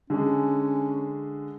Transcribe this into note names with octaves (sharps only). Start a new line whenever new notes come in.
D3 G#3 C#4